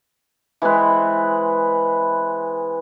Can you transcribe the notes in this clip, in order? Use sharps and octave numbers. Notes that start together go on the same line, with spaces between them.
E3 G#3 C4 B4